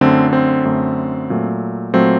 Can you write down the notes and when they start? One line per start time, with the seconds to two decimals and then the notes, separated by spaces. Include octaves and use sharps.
0.01 F#2 D3 A3 C4
0.33 C4
0.65 F#2 D3 A3
1.30 A#2 F#3 A3
1.94 A#2 F#3 A3 C4